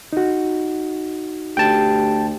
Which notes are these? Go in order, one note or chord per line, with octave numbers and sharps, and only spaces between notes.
D#4 F#4
D2 G4 G5 A5